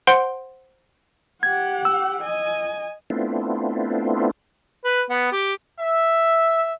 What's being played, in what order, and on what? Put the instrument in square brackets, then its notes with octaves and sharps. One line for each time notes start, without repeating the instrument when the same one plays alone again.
[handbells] C5 F#5 C6 D7
[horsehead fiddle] G4 F#5 [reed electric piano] G#6
[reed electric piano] E6
[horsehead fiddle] D#5 G#5
[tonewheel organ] A3 B3 C4 D4 E4 F4
[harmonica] B4
B3
G4
[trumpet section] E5